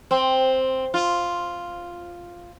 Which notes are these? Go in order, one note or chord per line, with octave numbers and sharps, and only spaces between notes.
C4
F4